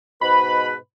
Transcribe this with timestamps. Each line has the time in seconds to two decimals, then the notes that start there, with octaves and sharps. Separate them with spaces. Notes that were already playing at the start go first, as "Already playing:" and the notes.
0.21 G#2 B2 B4 B5